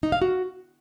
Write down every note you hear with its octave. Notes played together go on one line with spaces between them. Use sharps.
D#4
F5
F#4